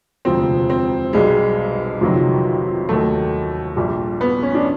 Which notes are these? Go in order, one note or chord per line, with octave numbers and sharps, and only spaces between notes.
E1 D2 C3 F3 C4
C4
B1 B2 G3 G#3
G1 F2 C3 D#3 F#3
D#2 D#3 F#3 A3
A#1 A#2 G3
B3
C#4
D4